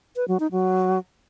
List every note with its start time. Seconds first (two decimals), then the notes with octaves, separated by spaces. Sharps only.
0.16 B4
0.28 F#3
0.40 D#4
0.52 F#3